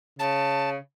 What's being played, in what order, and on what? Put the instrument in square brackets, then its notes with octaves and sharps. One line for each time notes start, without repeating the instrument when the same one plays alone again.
[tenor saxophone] C#3 [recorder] A5